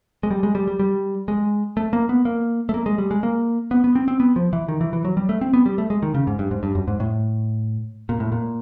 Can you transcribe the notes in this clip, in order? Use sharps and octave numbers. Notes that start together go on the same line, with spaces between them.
G#3
G3
G#3
G3
G3
G3
G#3
A3
A#3
B3
A#3
A3
A#3
G#3
G3
G#3
A#3
B3
B3
C4
C4
B3
F3
E3
D#3
E3
E3
F#3
G3
A3
C4
B3
G3
A3
G#3
D#3
C#3
G#2
G2
G#2
G2
F#2
G#2
A2
A#2
A2
A#2